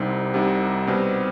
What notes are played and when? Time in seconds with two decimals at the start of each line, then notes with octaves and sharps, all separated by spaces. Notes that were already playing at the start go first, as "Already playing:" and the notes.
Already playing: C2 C3 G3 C4 D#4
0.34 C2 C3 G3 C4 D#4
0.87 B2 G3 C4